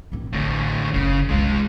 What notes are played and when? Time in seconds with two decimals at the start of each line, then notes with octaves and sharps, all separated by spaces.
0.12 A#2 C4
0.33 A1 D2 A2
0.94 F#1 F#2 C#3
1.29 C2 D#3 G#3 F4